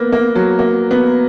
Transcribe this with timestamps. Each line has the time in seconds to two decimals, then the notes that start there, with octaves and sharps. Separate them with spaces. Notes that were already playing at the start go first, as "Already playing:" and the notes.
Already playing: A#3 B3
0.12 A#3
0.35 F#3
0.59 A#3
0.91 B3